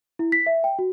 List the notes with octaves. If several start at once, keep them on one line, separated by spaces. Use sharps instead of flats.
E4
B6
E5
G5
F#4